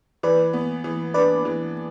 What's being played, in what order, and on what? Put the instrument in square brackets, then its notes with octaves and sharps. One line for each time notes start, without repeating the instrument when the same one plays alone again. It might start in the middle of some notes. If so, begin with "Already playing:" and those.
[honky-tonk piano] E3 [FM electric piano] B4 D5
[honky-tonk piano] B3
E3
[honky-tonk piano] D4 [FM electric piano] B4 D5
[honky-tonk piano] E3